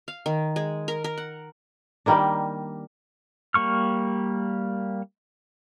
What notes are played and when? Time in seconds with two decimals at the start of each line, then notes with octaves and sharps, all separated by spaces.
0.08 F5
0.26 D#3
0.56 G#3
0.88 A#4
1.04 A#4
1.18 F#5
2.06 D#3 G3 A#3 D4
3.54 G3 A#3 C#6 F6